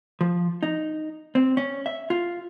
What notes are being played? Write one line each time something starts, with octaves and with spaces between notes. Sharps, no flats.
F3
D#4
C4
C#4
E5
F4